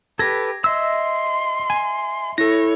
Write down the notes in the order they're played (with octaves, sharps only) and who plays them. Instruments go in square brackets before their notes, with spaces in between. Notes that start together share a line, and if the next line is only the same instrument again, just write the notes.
[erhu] G4 [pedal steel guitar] A4 B4 [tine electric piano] G#6 A#6
[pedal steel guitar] D#5 E5 E6 [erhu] C6
[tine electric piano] G#5
[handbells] E4 A4 [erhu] C#5 [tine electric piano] A#6